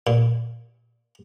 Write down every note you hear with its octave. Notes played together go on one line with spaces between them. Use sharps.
A#2